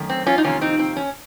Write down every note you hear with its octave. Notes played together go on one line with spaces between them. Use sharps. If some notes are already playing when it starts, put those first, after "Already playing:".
Already playing: F#2 D#3 A3
C4
C#4 F4
D#4
F2 C3 D#3 A#3 C#4 F4
C4 D#4
C4
C#4